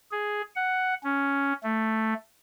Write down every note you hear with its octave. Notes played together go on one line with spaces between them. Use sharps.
G#4
F#5
C#4
A3